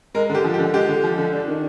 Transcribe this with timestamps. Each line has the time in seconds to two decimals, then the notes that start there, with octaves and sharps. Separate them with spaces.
0.14 G#3 A#4
0.29 D3
0.34 G4
0.44 F3
0.54 G4
0.59 D3
0.74 G#3 G4
0.89 D3
1.04 F3
1.18 D3
1.33 D4
1.48 D#3